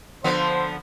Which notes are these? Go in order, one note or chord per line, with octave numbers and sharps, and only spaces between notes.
D3 F3 B3 C5